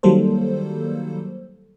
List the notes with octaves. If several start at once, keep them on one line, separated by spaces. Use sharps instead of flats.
D#3 F#3 G3 A#3 A4 C5